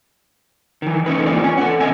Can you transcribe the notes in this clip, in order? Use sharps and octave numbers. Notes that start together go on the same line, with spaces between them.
D#3 E3
A3 C#4 D#4 B4
E3 F3 A#3 C4 F4 D5
C#4 G#5
A4 F#5
E2 C3 C4 D#5 E5 G#5